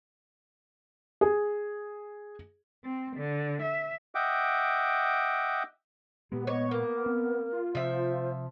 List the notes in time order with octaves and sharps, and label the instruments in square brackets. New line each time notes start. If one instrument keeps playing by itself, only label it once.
[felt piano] G#4
[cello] C4
D3
E5
[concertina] D#5 E5 F#5 G5 D6
[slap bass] A#2 G#3 [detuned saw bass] B3 [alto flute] G4
[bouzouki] C#5 [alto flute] D#5
[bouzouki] A#3 [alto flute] A#4
[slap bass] C4
[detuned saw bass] F4
[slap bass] C3 [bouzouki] F3 E5 [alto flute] C5